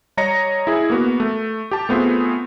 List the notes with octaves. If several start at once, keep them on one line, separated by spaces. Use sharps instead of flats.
G3 C#5 D#5 A#5 A#6 C#7
E4 G#4
A#3 B3 F#4
A3
G4 A5
A3 B3 C4 F4 G#4